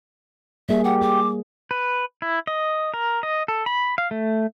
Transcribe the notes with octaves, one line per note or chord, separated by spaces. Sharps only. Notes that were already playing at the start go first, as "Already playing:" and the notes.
G3 A#3 G#4 E5
G4 F#5
G#4 D6
B4
E4
D#5
A#4
D#5
A4
B5
F5
A3